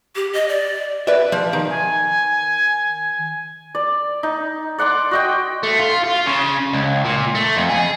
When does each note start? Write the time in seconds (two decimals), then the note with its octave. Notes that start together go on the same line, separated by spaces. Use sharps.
0.16 G4
0.33 D#5
0.49 D5
1.07 B4 D5 E5
1.32 F3
1.53 D#3
1.70 G#5
3.75 D5
4.23 D#4
4.78 D5 F#5 C6 D6
5.11 F#4 D#5 G5
5.63 A3
5.79 F4
6.04 F4
6.26 C#3
6.73 C#2
7.05 A#2
7.35 A3
7.56 F2
7.69 G#4